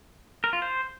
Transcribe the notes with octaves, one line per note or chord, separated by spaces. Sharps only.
A#4
F4
C5